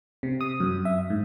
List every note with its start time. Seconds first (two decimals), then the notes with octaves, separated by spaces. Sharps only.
0.23 C3
0.41 D#6
0.60 F#2
0.85 E5
1.10 G#2